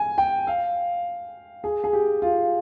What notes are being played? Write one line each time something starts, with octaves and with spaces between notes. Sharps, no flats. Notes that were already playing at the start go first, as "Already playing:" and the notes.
Already playing: G#5
G5
F5
G#4
G#4
G4
F4